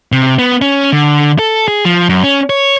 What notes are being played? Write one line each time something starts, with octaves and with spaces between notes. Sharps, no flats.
C3
B3
C#4
D3
A4
G#4
F3
F#2
C#4
C#5